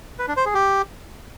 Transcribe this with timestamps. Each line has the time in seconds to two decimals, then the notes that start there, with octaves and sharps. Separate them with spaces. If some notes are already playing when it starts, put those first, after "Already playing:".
0.19 B4
0.28 D4
0.37 C5
0.46 G#4
0.54 G4